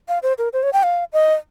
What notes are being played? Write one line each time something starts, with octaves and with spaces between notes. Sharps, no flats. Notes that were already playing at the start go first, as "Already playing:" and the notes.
F5
C5
A#4
C5
C#5
G5
F5
D#5